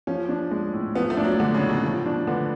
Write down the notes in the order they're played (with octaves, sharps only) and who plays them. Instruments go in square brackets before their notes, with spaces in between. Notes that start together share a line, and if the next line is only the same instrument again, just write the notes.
[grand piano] F3 [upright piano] C#4
[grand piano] D4
G#3
A2
[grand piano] F3 [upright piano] B3
[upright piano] A3
[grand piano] D4
[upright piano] F#3
[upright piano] D3 [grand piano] G#3
[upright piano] C#3
[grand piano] A2
[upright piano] B2
[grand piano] F3
D4
[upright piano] D3 [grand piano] B3